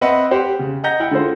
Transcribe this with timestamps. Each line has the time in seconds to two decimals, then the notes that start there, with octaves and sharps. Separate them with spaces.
0.01 C4 B4 D#5 E5 F#5
0.31 G4 C5 F#5
0.59 C#3
0.84 D#5 F#5 A#5 G6 A#6
1.00 E4 F#5 G5
1.11 D3 F4 G#4 A4 C5